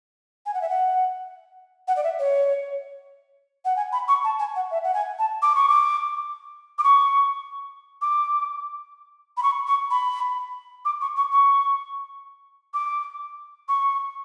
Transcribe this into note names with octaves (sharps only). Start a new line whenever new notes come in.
G#5
F#5
E5
F#5
F#5
D5
E5
C#5
F#5
G#5
B5
C#6
A5
G#5
F#5
E5
F#5
G#5
A5
D6
C#6
D6
D6
C#6
D6
B5
C#6
C#6
B5
D6
C#6
C#6
C#6
D6
C#6